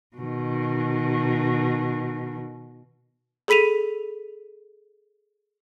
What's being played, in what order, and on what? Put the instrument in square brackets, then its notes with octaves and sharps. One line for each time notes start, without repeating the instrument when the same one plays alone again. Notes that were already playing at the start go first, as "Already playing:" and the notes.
[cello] B2 D#3
[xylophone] G#4 A4 B5 B6 D#7 F7